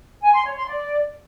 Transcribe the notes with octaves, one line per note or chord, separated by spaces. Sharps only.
G#5
C6
C#5
C6
D5